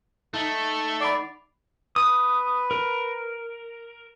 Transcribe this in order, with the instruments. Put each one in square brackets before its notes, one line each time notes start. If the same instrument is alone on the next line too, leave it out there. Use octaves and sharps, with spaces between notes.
[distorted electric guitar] A3 [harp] D#4
[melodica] D5 [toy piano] F#5 B5
[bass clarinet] B4 [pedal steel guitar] D#6
[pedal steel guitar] A#4